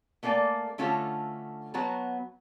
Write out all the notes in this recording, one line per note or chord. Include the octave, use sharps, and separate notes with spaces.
A3 A#3 A4 D5 G#5
D3 A3 C#4 F4 F#4 A4
F#3 B3 F#4 C#5 A5 A#5